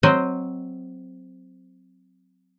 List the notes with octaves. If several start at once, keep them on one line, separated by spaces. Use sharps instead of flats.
F#3 C4 C5 D#5